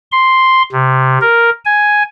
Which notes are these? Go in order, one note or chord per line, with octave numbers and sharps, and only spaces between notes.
C6
C3
A#4
G#5